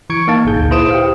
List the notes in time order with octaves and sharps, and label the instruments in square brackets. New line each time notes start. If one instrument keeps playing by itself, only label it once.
[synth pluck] E3 C#6 G#6 C#7 D7
A#3 D#4 F5 A5
G#1 A#2 G#4 G6
D2
E4 B4 C5 D#6 D7 E7
G4 F5